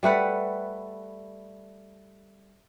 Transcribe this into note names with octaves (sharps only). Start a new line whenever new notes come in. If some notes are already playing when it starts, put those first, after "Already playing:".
G3 A3 B4 F#5